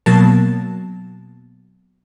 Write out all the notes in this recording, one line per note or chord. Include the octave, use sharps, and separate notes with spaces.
B2 F#3 A#3 A5